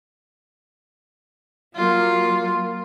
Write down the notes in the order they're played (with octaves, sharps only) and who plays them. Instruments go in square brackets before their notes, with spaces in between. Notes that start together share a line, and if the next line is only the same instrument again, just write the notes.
[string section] F#3 A#3 [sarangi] F4